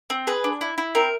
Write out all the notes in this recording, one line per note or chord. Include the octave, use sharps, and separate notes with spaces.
C4
G#4 B4
D4
E4
E4
C4 A#4